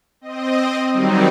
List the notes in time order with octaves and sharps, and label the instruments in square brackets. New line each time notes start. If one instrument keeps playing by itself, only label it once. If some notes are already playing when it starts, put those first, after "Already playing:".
[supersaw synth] C4 D#5
D#3 F#3 G3 C4 D#4